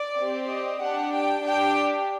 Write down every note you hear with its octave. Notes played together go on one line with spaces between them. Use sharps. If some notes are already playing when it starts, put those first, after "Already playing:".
Already playing: D5
C4 G4
D#5
D4 G4 F#5
G5
D4 G4 G5